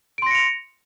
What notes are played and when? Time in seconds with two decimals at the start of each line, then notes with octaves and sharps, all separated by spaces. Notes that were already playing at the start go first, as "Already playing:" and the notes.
0.18 D7
0.22 C6
0.26 A#6
0.31 C#7
0.35 F7